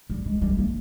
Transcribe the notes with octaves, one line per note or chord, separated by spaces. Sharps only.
G3
G#3
G3
A#3